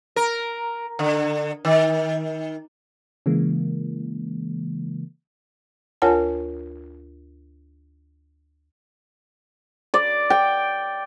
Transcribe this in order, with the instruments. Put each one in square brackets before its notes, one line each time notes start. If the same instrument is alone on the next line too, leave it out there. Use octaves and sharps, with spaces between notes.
[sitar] A#4
D3
D#3
[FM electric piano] C#3 E3 G#3 A#3
[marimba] D2 F4 A#4 C#5 G#5 A5
[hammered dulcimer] D5
G5